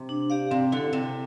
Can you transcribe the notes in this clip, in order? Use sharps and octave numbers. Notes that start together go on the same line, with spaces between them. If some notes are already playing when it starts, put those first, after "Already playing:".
Already playing: C3
D4
G4 D5 F5
C3 C4
D3 E4 A4
C3 C4